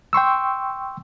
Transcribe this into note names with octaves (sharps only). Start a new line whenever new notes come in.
G5 C6 C#6 E6